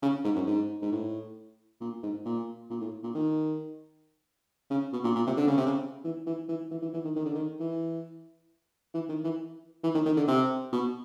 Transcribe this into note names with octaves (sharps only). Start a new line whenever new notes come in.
C#3
G#2
F#2
G#2
G#2
A2
A#2
G#2
A#2
A#2
A2
A#2
D#3
C#3
B2
A#2
A#2
C3
D3
C#3
C3
C#3
E3
E3
E3
E3
E3
E3
D#3
D#3
D3
D#3
E3
E3
D#3
E3
E3
D#3
D#3
D3
C3
B2